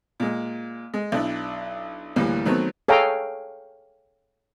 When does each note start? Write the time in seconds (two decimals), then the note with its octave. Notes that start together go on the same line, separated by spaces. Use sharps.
0.20 A#2 G#3
0.94 G#3
1.12 B1 D4 E4
2.16 D2 A2 E3 G3 A#3
2.46 D#3 F#3 A3 B3 C4
2.88 G#4 A4 C#5 F5 G5 A#5